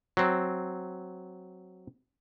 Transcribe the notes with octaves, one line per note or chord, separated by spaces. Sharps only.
F#3 C4